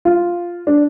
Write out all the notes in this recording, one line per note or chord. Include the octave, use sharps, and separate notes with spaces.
F4
D4